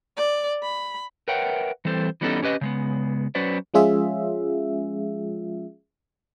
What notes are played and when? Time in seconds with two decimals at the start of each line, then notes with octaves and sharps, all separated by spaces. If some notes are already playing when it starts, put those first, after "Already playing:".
0.17 D5
0.63 B5
1.28 A#4 B4 C#5 E5 F#5 G5
1.85 E3 G3 C4 A4 C5
2.21 E3 G3 B3 C#4 D#4 A4
2.42 C#4 G4 B4 D#5
2.61 C#3 G#3 B3
3.35 F#3 C#4 F#4 B4 C5 D5
3.74 F3 G#3 C#4 F4 G#4 E5